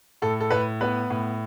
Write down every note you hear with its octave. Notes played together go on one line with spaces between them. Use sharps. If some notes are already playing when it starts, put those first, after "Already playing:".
A2 A4
A4
A2 B4
B3 B4
A2